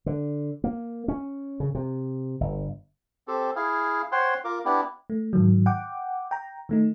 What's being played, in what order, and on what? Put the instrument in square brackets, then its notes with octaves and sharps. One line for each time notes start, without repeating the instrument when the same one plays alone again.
[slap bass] D3
A#3
C#4
C#3
C3
G1
[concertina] C4 G4 A4
E4 G#4 F5
C5 C#5 F#5 G5 C6
F4 A#4 D6
B3 D4 E4 G4
[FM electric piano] A3
G#2 D#3 F#3
F#5 G5 D6
G5 A#5
D#3 A3 D#4